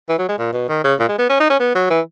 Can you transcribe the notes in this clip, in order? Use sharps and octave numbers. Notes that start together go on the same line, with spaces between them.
E3
F#3
G#3
A#2
B2
D#3
C#3
A#2
G#3
B3
C#4
D#4
C#4
B3
F#3
E3